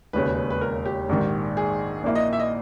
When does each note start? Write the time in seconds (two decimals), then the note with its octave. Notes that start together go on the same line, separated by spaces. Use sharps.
0.13 E1 D#2 C#3 B4
0.50 B4
0.61 A#4
0.86 G4
1.09 A#1 G#2 D#3
1.57 G#4
2.04 A#1 A#2 A#3 E4
2.15 D#5
2.33 E5
2.40 D#5